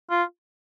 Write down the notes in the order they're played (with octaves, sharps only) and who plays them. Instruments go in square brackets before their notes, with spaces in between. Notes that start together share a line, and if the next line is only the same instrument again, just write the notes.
[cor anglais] F4